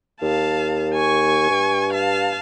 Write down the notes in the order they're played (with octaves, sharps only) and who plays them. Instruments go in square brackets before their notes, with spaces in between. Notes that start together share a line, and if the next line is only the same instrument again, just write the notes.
[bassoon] D#2 [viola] F5 A5
[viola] G#5 C#6
[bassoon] G2
[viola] F5 A5